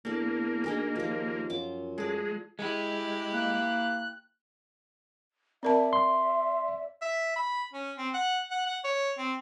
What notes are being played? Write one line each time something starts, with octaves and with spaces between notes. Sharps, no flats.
E2 A#3 D4 A4
D2 D#4 G#4 A#4
D#2 F3 F4
F#2 F4 D6
G#3 A4 D5
G#3 E4 G4
A#3 F#6
C4 A#4 D5 E5 A5
C6
E5
B5
C#4
C4
F#5
F#5
F#5
C#5
C4